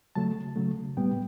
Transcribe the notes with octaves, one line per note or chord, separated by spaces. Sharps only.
C#3 F#3 A3 A5
C#3 F#3 A3
A2 G3 B3 G5